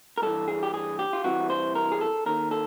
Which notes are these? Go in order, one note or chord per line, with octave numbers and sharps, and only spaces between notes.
A#4
G2 E3 A4
G#4
G4
G#4
G4
F4
C2 C3 E3 F#4
C5
A#4
G#4
A4
D#2 D#3 A#4
A4